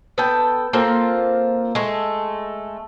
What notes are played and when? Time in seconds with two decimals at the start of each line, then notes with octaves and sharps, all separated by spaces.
0.18 B3 A4 G5
0.73 A#3 C4 F4 A4
1.75 G#3 A3